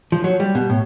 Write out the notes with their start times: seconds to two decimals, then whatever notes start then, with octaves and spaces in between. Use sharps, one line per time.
0.12 F3
0.24 F#3
0.40 G3
0.55 B2
0.70 A2